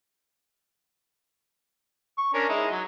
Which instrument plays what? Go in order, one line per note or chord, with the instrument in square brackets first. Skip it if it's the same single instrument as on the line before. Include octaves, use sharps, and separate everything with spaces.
[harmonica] C#6
C#4 D4 A#4
G#3 D#4 E4
F#3